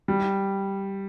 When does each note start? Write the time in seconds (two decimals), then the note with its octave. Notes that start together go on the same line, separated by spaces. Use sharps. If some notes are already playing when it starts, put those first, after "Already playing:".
0.08 G3